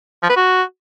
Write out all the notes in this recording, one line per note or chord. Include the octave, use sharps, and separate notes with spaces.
F3
B4
F#4